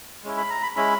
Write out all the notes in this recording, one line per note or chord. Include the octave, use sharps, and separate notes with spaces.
G#3 C#4 E4
B5
A#5
B5
G#3 C#4 E4 B5